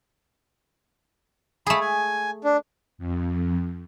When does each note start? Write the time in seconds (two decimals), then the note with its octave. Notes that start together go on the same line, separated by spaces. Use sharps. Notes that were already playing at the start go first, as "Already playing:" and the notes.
1.67 A3 G#4 B5
1.81 G#5
2.44 D4
2.98 F2